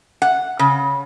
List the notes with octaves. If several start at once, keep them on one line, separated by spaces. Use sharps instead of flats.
F#5
C#3